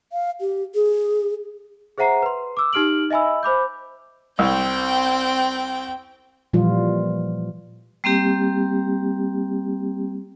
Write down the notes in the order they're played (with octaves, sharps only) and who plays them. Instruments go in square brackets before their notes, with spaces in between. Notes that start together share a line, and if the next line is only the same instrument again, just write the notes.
[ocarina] F5
G4
G#4
[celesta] G#4 C5 E5 F#5 A#5 C7
B4 C6
D6 E6
D#4 G4 F6 D7 F#7
D#5 E5 G#5 B5 E6
C5 B5 D6 G6
[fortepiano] C2 [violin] C4 G5
[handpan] A#2 E3 F3 G3 F4
[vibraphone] G3 A#3 C4 G4